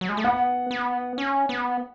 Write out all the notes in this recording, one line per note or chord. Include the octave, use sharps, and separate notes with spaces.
F#3
G#3
A3
B3 F#5
B3
C#4
B3